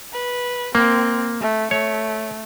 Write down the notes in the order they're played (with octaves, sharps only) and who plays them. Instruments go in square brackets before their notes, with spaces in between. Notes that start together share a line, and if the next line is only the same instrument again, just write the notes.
[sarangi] B4
[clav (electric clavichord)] A#3 [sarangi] C4
[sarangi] A3
[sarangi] A3 [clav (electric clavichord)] C#5